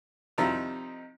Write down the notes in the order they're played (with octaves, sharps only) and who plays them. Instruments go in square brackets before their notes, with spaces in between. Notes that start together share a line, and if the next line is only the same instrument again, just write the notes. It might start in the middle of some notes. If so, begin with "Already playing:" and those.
[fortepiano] C3 D#3 F3 G3 D#4 E4